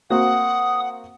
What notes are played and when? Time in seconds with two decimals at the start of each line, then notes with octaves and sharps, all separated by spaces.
0.10 A#3 C4 F#4 F#5 D#6